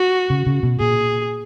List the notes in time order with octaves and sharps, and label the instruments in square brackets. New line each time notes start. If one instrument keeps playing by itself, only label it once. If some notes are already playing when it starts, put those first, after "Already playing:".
Already playing: [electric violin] F#4
[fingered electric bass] C#3
C#3
B2
[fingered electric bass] A#2 [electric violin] G#4